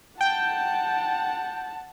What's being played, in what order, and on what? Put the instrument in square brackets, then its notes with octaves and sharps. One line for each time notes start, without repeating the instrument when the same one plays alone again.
[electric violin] F#5 A5 [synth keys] G5